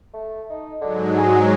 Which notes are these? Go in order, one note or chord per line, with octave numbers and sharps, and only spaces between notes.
A3
D#4
G#2 D3 F#3 G#3
G#4